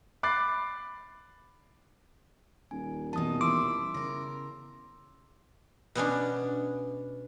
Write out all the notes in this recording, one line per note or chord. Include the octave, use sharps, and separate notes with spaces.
B5 D6 F#6 A6 C7
D#1 G#5
B2 E3 A5 D#6
E4 C6 D6 E6
C#3 A#4
B2 B3 C#4 D4